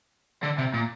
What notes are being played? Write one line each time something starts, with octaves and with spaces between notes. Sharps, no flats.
D3
C3
A#2